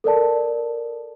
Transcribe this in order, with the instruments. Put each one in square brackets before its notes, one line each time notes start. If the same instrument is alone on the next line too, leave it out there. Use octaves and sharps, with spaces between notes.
[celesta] A4 A#4 D5 A5